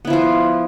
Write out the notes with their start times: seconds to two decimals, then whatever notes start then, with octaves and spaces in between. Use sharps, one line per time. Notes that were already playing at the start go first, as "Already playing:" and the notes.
0.05 B3
0.07 E4
0.10 F3
0.13 F4